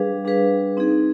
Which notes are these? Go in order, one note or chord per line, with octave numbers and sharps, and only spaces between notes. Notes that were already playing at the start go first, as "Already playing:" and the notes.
Already playing: G3 D4 G#4 B4 F5
G3 D4 G#4 B4 F5
C4 D#4 G#4